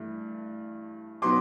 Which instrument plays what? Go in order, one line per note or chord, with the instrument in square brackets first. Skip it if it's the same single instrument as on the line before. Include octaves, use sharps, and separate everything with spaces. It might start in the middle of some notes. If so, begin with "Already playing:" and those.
Already playing: [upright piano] G2 E3 A3
B2 F#3 B3 D#4 C6 D6